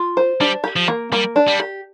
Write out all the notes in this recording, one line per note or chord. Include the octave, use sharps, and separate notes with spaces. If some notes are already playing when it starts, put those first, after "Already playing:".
Already playing: F4
C5
G3 D4
G4
F3
A#3
G3 A#3
D4
G3
G4